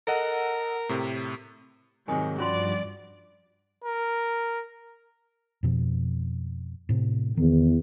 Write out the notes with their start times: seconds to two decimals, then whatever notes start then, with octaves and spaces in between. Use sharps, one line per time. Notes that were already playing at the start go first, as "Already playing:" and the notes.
0.08 A4 A#4 D#5 F#5
0.89 A2 C3
2.08 G#2 C3 D#3 F#3 G#5 D#6
2.38 G2 F3 C#4 F4 F#4 D5 C6
3.84 A#4
5.63 F2 B2 F3
6.89 A2 C3
7.37 E2 D#3